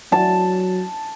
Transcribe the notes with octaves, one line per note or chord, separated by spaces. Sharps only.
F#3 A5